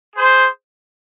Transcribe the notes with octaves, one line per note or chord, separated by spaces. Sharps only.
G#4 C5